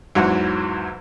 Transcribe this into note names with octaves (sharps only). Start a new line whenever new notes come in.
E2 G#2 E3 F#3 F#5